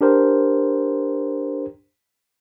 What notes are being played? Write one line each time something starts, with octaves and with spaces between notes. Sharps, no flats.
D4 G4 A#4 C5